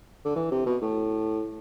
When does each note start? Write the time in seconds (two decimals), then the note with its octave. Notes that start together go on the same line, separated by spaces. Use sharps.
0.25 D3
0.36 E3
0.51 C3
0.66 B2
0.82 A2